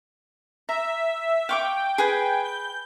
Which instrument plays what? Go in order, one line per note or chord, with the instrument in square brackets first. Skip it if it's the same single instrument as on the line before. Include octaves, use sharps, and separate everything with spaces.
[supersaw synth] E5 [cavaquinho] A#5
[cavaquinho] F5 C#6 D6 [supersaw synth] G5
[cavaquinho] G#4 B4 G#5
[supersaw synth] G6